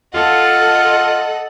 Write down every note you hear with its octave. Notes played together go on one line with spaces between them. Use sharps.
F4 A4 D#5 F#5